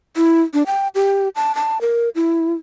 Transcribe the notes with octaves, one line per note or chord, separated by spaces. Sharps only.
E4
D4
G5
G4
A5
A5
A#4
E4